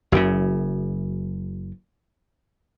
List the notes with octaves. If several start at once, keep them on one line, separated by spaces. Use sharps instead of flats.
F#1 F#2 A#2 C#3